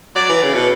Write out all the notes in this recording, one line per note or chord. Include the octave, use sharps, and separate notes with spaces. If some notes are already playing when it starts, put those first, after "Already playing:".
F#3 D5
E3
C#3
B2